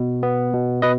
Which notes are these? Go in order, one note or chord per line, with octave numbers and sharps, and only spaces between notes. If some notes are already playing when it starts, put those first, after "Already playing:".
Already playing: B2
B3
B2
B2 B4 D#5